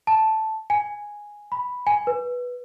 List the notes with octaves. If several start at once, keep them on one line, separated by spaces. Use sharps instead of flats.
A5
G#5
B5
G#5
B4